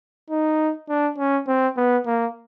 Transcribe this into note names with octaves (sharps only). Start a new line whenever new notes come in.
D#4
D4
C#4
C4
B3
A#3